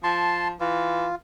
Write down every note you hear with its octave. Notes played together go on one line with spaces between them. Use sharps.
F3 A5 C6
E3 F4